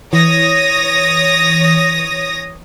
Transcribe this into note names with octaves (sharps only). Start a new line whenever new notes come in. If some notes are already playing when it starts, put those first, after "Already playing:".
E3 C#5 D#6 A#6